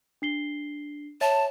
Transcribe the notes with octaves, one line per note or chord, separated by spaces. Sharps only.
D4 C7 G7
C#5 E5 A5 A6